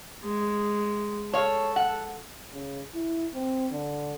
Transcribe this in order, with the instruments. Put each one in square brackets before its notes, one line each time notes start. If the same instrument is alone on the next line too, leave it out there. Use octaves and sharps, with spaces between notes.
[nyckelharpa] G#3
[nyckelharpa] A4 [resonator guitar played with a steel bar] C#5 F5
[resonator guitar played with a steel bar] F#5
[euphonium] C#3
E4
C4
D3